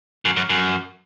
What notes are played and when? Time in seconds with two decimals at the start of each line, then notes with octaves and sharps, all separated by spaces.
0.25 F#2
0.36 F#2
0.49 F#2